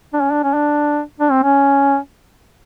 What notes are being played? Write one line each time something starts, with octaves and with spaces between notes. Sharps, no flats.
D4
C#4
D4
C#4
D4
D4
C4
C#4